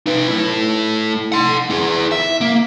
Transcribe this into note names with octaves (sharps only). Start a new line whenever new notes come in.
D#4 B4
A3 E4
F#5 C6
E4 G#4
E5
A#3